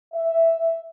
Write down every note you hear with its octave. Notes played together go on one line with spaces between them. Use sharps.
E5